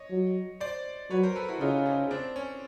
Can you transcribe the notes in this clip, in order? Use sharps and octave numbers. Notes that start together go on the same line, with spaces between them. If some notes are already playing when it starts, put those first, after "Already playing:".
Already playing: C#5 D#5
F#3
C5 D5
F#3 B4 C#5
A#4 C5
A4 B4
E4 F#4
C#3 D#4 F4
C#4 D#4
C4 D4
C#4